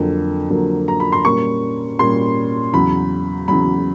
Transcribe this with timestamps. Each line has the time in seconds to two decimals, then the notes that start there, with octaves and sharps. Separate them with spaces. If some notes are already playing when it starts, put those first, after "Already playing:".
Already playing: F2 D3 F#3 A#3
0.50 F2 D3 F#3 A#3
0.88 A#5
1.00 B5
1.12 C6
1.25 A#2 G3 A#3 C#4 C#6
1.99 A#2 G3 A#3 C#4 C6
2.74 E2 C#3 F#3 B5
3.48 E2 C#3 F#3 B5